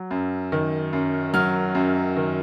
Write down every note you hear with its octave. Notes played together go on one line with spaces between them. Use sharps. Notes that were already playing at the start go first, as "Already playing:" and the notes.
Already playing: F#3
F#2
D#3
F#2
F#3 F6
F#2
D#3